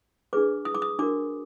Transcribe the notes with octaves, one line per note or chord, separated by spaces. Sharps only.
D4 G#4 B4 D6
D#6
D6
D#6
D4 F#4 A#4 D6